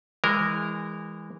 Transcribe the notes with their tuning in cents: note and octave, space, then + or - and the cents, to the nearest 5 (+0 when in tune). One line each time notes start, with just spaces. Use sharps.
E3 +0 G#3 -25 A#4 -15